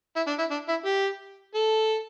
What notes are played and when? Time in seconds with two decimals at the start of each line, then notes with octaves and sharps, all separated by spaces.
0.16 E4
0.27 D4
0.39 E4
0.51 D4
0.68 E4
0.85 G4
1.55 A4